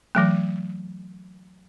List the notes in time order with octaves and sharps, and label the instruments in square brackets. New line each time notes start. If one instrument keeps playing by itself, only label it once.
[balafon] E3 F#3 A3